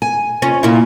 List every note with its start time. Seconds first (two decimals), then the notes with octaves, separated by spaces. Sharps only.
0.02 G#5
0.42 C#4 F4
0.63 A#2 E4